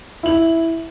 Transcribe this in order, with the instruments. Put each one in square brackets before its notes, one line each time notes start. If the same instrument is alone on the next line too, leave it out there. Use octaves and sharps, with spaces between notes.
[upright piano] E4 F#7